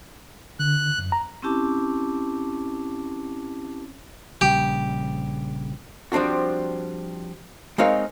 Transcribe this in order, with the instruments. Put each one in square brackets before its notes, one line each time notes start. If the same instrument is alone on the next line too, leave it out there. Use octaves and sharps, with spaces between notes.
[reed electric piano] D3 [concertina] F#6
[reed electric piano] F#2
A#5
[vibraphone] C4 C#4 E4 G4 A5 D6
[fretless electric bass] A#1 C#3 G3 [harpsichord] G4
[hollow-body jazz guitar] F3 G3 C4 D4 F#4
G#3 C4 D#4 A#4 C#5 F5